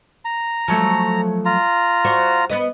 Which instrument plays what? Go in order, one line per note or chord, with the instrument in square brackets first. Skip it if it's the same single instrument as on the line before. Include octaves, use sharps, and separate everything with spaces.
[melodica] A#5
[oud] F3 F#3 A3
[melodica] F4 A#5
[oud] F#4 C5 D5
B3 B4 D#5